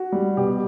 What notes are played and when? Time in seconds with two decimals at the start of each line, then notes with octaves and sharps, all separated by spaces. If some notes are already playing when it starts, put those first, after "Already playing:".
Already playing: F#4
0.12 G3
0.37 B2 G4